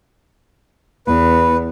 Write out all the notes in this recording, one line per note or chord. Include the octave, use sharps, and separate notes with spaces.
E2 B4